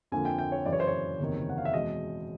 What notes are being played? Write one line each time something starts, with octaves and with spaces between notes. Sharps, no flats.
F2 D3 F3 A#3 G#5
G5
G5
C#5
F#2 C#3 E3 D5
C#5
C5
C#5
F#1 E2 C3 D#3
F#5
F5
E5
E2 B2 G#3 C4 D#5